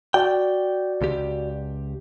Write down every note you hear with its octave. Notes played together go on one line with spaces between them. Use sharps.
F#4 D5 G5
C#2 G4